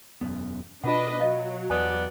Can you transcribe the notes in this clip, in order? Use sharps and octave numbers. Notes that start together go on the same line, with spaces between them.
E1 F#2 B3
B2 D4 F4 B4 D#5 F#5
F#3 D#5 F5
E2 G2 B3 D5 G#5 D#6